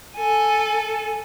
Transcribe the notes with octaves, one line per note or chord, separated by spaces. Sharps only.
A4 G#5